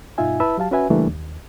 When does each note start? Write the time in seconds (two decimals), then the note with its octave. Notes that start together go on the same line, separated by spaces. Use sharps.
0.18 G2 B2 D#4 F4 E5 G#5
0.40 E4 B4 E5 A5 B5 E6
0.58 F#3 G4 F5 A5
0.71 C#4 F#4 B4 E5 G#5
0.90 C#3 E3 G3 A3 A#3 D4
1.07 D#2